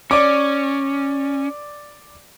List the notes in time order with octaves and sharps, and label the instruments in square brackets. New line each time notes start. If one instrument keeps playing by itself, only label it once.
[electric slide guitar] C#4 [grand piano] D5 D6